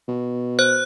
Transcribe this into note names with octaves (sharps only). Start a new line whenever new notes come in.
B2
C5 F#6